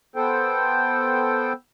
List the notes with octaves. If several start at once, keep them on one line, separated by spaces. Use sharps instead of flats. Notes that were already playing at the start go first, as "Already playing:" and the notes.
B3 A4 C5 G5